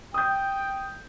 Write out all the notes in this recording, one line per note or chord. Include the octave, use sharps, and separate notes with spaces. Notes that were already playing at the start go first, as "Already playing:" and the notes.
G5 D#6 G6